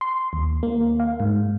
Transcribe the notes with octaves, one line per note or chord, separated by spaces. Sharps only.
C6
D#2
A#3
F5
G#2